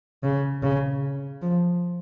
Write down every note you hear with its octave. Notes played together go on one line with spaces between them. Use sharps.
C#3
C#3
F3